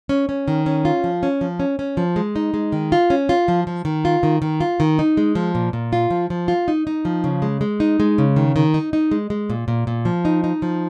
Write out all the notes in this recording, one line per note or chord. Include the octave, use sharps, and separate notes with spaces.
C#4
C#4
D#3
C#4
F4
F3
C#4
F3
C#4
C#4
F3
G#3
D#4
G#3
D#3
F4
C#4
F4
F3
F3
D#3
F4
D#3
D#3
F4
D#3
D#4
G#3
F3
A#2
A#2
F4
F3
F3
F4
D#4
D#4
F3
C#3
G#3
G#3
D#4
G#3
C#3
D#3
D#3
D#4
D#4
G#3
G#3
A#2
A#2
A#2
F3
D#4
D#4
F3